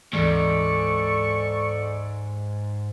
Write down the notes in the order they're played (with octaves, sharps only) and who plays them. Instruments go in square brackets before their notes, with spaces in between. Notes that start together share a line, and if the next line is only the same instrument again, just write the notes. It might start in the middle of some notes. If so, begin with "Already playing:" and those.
[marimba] D2 E3 [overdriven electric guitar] G#2 [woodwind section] A4 D5 C#6